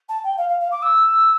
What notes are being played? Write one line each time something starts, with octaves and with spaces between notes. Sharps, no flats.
A5
G5
F5
F5
F5
D6
E6